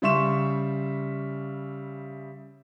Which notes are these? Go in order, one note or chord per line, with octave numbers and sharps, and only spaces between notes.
C#3 G3 E5 C6 C#6 E7